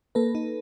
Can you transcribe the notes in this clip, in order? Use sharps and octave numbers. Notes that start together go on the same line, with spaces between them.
A#3 A4 B4
D#4